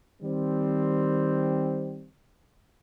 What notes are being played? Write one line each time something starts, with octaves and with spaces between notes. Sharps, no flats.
D#3 G3 C4